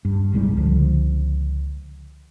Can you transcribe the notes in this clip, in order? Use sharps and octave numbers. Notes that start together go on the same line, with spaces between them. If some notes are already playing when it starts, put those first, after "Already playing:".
G2
G1 C2 G#2 G3
C#2 D3 F3